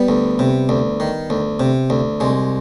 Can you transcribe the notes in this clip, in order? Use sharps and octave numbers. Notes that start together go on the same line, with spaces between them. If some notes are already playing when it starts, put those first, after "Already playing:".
Already playing: G3 B3
D2
C3
D2
D#3
D2
C3
D2
C2 G#3